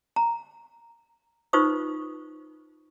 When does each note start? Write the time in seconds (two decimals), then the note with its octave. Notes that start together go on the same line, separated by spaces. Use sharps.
0.16 A#5
1.53 D#4 F4 B4 C5 C#6 D#6